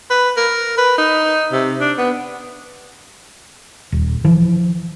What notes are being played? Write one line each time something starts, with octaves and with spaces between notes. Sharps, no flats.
B4
A#4
B4
D#4
C3
D4
B3
D#1
E3 F3